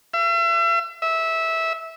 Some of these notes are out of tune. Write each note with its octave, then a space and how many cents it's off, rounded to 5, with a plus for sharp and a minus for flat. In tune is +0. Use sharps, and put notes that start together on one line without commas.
E5 +40
E5 -15